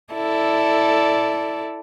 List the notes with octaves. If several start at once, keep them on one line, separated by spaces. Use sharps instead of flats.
E4 A4 D5